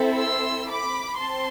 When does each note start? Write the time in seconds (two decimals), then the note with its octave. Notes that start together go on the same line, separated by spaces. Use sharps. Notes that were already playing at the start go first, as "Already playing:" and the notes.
Already playing: C4 E4 A4
0.18 C6 E6
0.69 B5 D6
1.19 C4 A5 C6